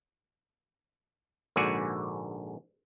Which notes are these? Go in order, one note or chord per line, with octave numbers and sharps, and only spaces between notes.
A#1 G#2 D3 F#4 D5 G#5